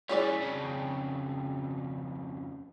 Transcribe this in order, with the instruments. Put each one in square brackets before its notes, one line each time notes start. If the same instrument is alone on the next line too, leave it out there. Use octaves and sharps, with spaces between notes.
[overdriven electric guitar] E3 G3 [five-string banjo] C#4 G#4 D5
[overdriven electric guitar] F2 C#3